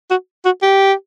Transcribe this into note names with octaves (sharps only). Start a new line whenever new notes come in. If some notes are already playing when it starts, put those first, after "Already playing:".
F#4
F#4
G4